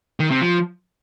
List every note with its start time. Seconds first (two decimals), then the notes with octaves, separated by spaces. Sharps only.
0.20 D#3
0.30 C3
0.41 F3